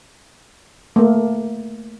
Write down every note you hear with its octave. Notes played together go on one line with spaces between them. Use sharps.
A3 A#3